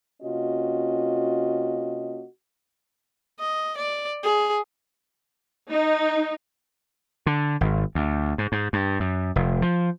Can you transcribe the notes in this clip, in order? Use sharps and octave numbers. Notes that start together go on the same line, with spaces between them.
C3 A#3 C#4 F4 F#4 D#5
D#5
D5
G#4
D#4
D3
G#1
D2
G#2
G#2
G2
F#2
F1
F3